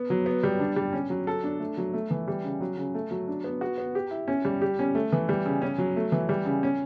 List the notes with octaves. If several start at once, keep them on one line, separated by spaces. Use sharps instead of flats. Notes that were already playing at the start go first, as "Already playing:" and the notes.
Already playing: B3
F#3
B3
G3
D4
G3
C#4
F#3
A4
D4
A3
F#3
A3
E3
G3
C#3
F#3
C#3
A3
F#3
D4
B3
F#4
B3
G4
E4
C#4
G3
G4
C#4
A3
E3
G3
C#3
C#4
F#3
A3
E3
G3
C#3
C#4